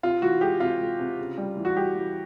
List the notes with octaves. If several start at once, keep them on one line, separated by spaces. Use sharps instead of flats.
C3 F4
E3 F#4
G#3 G4
C3 F4
G#3
C3
C#3
G3
E3
F#4
G3 G4
E3